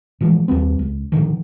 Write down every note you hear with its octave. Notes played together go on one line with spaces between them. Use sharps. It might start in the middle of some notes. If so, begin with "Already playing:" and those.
A2 E3 F3 G#3
D#2 G3 B3 C4
C#2
A2 D3 D#3 F3